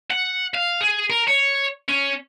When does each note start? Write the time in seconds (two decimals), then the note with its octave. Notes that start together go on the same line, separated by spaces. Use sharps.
0.10 F#5
0.54 F5
0.81 G#4
1.10 A#4
1.27 C#5
1.88 C#4